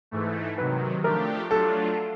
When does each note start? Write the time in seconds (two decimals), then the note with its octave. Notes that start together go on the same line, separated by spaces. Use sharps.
0.11 G#2 E3 A3
0.57 C3 D#3 F#3 B4
1.04 F3 A3 D4 G4 A#4
1.50 F#3 A3 D4 F4 A4